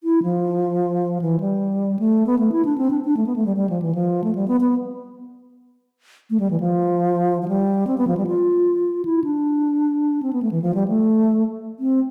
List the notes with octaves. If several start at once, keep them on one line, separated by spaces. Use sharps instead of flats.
E4
F3
E3
G3
A3
B3
A3
E4
D4
C4
D4
D4
A3
B3
A3
G3
G3
F3
E3
F3
A3
G3
B3
B3
A3
G3
E3
F3
F3
G3
C4
B3
F3
G3
F4
E4
D4
C4
B3
A3
E3
F3
G3
A3
C4